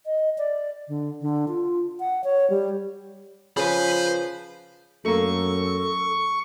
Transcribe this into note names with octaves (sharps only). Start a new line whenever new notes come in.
D#5
D5
D3
D3
F4
F#5
C#5
G3
C#3 F3 B4 C5 B5
F#2 A3 A#3 A4 C#6